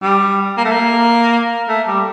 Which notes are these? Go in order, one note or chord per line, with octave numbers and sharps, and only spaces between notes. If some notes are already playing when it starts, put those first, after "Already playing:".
G3
A#3
A3
A#3
A3
G3